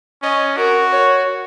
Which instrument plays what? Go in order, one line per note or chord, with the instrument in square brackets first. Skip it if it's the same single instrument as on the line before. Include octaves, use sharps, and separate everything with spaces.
[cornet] C#4 [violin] D#5
[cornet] F#4 [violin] A#4
[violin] C#5